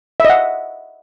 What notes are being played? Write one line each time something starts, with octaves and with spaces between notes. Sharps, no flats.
D#5 E5 F#5